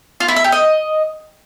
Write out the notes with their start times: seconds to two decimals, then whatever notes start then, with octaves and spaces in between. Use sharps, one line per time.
0.20 F4
0.28 E4
0.36 E5
0.44 G4
0.52 D#5